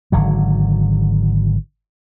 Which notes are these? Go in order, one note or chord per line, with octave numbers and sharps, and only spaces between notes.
G#1 D3 F#3